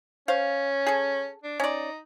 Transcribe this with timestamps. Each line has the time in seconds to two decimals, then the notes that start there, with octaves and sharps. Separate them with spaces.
0.28 C#4 C5 F5
0.87 G#4 A4
1.44 D4
1.60 C#4 D#4 D5